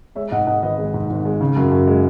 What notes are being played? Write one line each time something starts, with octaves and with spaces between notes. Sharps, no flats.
G#3 C#5 E5
G#2 D#5 F#5
G#2 D#5 F#5
G#1 B4 D#5
G#3
G#2
G#1
G#3
C#3
F#2
F#2
G#3